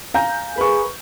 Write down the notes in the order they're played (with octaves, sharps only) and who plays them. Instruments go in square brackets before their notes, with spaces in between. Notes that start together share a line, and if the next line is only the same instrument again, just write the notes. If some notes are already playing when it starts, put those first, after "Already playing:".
[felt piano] F5 G#5 G6 [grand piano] A#5
[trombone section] G#4 A#4 [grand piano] B4 C#6